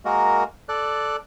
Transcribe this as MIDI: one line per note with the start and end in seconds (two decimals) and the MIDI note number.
0.05 0.44 56
0.05 0.44 58
0.05 0.44 66
0.05 0.44 70
0.69 1.16 69
0.69 1.16 74
0.69 1.16 90